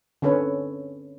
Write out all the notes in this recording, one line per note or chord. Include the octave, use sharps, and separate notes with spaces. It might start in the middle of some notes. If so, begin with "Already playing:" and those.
D3 C4 C#4 A4 B4 C#5